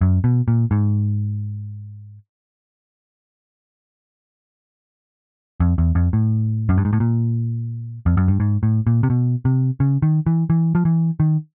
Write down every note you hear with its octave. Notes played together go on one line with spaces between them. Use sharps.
F#2
B2
A#2
G#2
F2
E2
F2
A2
F#2
G2
G#2
A2
A#2
F2
F#2
G2
G#2
A2
A#2
C3
B2
C3
C#3
D#3
E3
E3
F3
E3
D#3